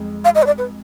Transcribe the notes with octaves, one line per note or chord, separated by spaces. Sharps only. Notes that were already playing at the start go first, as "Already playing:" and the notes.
Already playing: F2 G#3
F5
D#5
B4
D5
B4